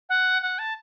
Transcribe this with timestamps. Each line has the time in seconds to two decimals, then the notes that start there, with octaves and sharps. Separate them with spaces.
0.09 F#5
0.42 F#5
0.59 A5